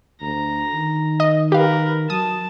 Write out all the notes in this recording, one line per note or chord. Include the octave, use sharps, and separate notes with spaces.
D2 A#5
D#3
D#5
G4 A#4 B4 F5
F#3 A5 D#6